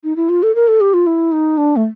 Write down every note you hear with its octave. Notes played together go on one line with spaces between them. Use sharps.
D#4
E4
F4
A4
A#4
A4
G4
F4
E4
D#4
D4
A3